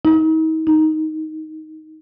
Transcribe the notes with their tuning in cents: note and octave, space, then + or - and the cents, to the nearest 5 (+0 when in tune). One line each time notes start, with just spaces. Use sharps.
D#4 +40
D#4 +10